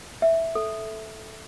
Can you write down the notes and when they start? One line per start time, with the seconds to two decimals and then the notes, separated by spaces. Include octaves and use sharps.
0.22 E5
0.55 A4